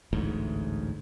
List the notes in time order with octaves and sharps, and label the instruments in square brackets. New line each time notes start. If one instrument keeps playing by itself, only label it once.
[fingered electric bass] A1 D2 G#2